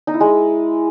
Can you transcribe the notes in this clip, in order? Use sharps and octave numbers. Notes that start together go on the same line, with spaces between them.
D#4
E4
G#3